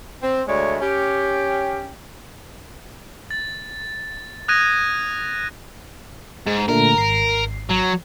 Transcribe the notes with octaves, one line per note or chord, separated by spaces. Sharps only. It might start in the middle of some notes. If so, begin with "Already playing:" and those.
C4
D2 G#3 A3 C#5 D5
C#4 G4
A6
D#6 F#6 G#6 A#6 D#7
G#2 G#3
A#2 D3 A3 A#4
G#1 C7
F#3